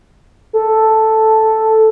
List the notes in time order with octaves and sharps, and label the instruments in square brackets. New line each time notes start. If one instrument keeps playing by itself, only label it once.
[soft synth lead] A4